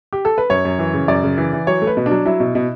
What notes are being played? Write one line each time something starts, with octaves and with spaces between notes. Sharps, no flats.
G4
A4
B4
F#2 C#5
F#2
E3
C#3
F#2 D5
C#3
E3
E3
F#3 C#5
A3
B4
B2
F#3 D4
F#3 E4
B2
B2